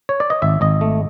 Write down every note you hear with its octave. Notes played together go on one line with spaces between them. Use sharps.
C#5
D5
D#5
G#1 E5
G#1 D#5
A3